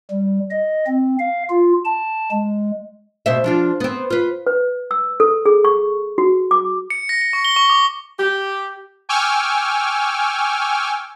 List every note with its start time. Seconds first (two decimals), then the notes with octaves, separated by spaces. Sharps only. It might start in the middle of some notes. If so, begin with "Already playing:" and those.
0.10 G3
0.51 D#5
0.86 C4
1.19 F5
1.50 F4
1.85 A5
2.31 G#3
3.26 B2 C5 E5
3.44 F3 D4 F4
3.80 B3 C4
4.10 F4 B4
4.47 B4
4.91 E6
5.20 A4
5.46 G#4
5.65 C#6
6.18 F#4
6.51 D6
6.90 C#7
7.09 A#6
7.22 C#7
7.33 C#6
7.45 G7
7.56 C#6
7.70 D6
8.19 G4
9.09 G5 G#5 C#6 D6 E6 F6